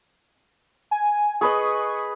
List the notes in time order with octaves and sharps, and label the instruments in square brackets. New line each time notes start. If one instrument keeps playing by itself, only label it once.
[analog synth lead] G#5
[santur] G#4 B4 D#5 [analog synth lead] C#6